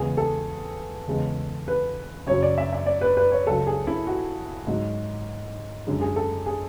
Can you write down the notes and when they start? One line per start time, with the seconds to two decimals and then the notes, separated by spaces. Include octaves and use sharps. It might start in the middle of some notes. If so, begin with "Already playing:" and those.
Already playing: E2 C#3 G#3 G#4
0.17 A4
1.08 E2 C#3 G#3
1.68 B4
2.27 F#2 C#3 F#3 C#5
2.43 D5
2.58 E5
2.73 E5
2.86 D5
3.01 B4
3.17 B4
3.32 C#5
3.46 C#2 C#3 F#3 A4
3.67 G#4
3.87 E4
4.07 F#4
4.67 G#2 F#3
5.87 F#2 D3 G#3
6.01 G#4
6.16 A4
6.46 G#4